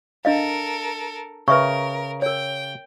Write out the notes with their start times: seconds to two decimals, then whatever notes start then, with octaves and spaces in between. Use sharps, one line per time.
0.25 D4 A4 A#4 D#5 F5
1.48 C#3 A#4 B4 E5 C#6
2.22 A#4 C#5 G5